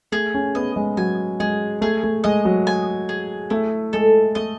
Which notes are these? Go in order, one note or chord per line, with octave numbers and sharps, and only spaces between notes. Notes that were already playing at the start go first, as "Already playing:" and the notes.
A3 G#4
C#4
B3 D#5
G#3
F#3 G#5
G#3 G#4
A3 G#4
A3
G#3 D#5
F#3
G#5
G#4
A3 E4
G#3 A4
A3 D#5